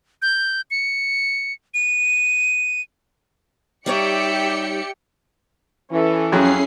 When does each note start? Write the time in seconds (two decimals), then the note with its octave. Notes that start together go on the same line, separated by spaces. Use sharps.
0.22 G6
0.71 C#7
1.74 D#7
3.86 G3 D#4 G4 C#5 D5 E5 G5 C#7
5.91 E3 C#4 A4
6.32 F2 F#3 C#4 E4 G#4 C7